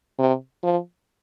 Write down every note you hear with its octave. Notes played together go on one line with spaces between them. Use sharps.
C3
F3